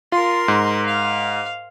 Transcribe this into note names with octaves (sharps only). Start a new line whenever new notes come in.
F4 A#4 C6
G#2
F5